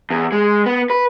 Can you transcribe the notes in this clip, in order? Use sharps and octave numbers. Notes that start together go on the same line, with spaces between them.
E2
G#3
B3
B4